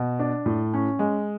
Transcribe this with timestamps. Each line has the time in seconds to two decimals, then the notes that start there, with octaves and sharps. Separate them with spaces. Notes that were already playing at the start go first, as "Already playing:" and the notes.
Already playing: B2
0.19 D4
0.46 A2
0.74 C#4
0.99 G#3